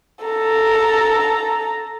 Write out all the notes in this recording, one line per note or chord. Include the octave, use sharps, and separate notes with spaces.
A4 A#5